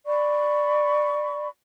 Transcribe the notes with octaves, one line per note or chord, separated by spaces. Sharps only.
D5 B5 C#6